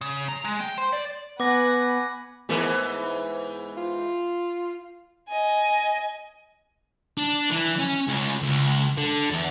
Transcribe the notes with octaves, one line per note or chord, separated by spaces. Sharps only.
C#3
A#5
G#3
G5
C5
D5
B3 B4 F#5 G#5 D6 A#6
G#2 E3 B3 G#4 A#4
F4
D#5 G#5
D4
E3
C#4
C#2
C#2
D3
E2